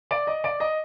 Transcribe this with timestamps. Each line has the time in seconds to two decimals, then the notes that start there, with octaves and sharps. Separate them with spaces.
0.11 D5
0.27 D#5
0.44 D5
0.60 D#5